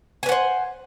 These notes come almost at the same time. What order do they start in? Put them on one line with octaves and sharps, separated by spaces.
G#5 B4 F#5 C5